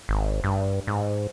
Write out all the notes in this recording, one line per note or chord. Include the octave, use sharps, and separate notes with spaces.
G#1
G2
G#2